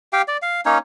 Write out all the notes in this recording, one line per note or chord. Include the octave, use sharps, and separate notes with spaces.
G4 F5 G5
D5
F5
A#3 C#4 D#4 C#5